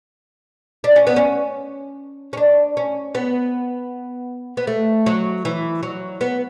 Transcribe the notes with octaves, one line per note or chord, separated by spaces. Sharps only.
D4
C#4
B3
C#4
C#4
D4
C#4
B3
B3
A3
F#3
E3
F#3
B3